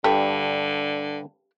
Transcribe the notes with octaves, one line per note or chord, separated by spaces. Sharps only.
G2 D3 G4 A4